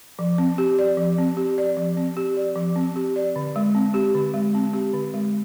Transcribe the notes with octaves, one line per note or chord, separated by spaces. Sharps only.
F3
C4
G4
D5
F3
C4
G4
D5
F3
C4
G4
D5
F3
C4
G4
D5
D3
G#3
C4
G4
D3
G#3
C4
G4
D3
G#3